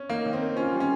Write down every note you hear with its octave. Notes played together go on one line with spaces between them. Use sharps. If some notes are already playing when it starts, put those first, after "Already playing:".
Already playing: C#4
A#3 D#4
D#3
C4
A#3
C#4 F4
G3
C#4